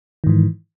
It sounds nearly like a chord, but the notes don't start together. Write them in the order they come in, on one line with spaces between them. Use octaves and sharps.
D#3 G#2 E3